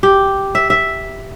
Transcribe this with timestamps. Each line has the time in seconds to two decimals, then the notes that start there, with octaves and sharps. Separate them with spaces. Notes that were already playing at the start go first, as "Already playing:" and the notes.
0.03 G4
0.55 E5
0.70 E5